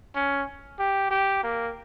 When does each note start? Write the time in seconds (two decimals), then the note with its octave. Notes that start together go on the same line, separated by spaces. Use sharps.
0.15 C#4
0.79 G4
1.10 G4
1.43 A#3